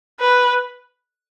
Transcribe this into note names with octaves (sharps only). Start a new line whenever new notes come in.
B4